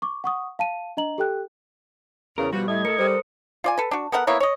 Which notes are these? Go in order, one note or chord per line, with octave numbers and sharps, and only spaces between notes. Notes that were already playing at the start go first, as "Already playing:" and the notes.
C#6 D6
F#5 C#6 D#6
F5 A5 D#7
D4 D#5 A#5 F#7
G4 A4 G5 F#6
E2 C#3 A#4
B2 F3 G3 F#4
A2 A3 D#5 G#6
A4 A#4 C#7
G3 C5 D#6
F4 D5 G#5
A4 B4
D4 F#4
B3 A4 A#4 F#5
A#3 B3 E4 C#5
C#5 D#5